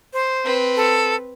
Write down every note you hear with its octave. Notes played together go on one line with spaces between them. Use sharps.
C5
C4 B4
A4